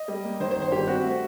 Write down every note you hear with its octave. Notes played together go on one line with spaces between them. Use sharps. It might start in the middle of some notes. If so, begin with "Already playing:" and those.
Already playing: D#5
G3
A#3
D#3 C5
C5
G1
C5
G3 G4
C4 F#4
A3